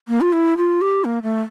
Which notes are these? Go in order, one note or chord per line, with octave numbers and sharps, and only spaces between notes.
A#3
F4
E4
F4
G4
A#3
A3